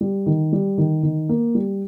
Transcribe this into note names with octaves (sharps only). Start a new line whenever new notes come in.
G3
D#3
G3
D#3
D#3
A#3
G3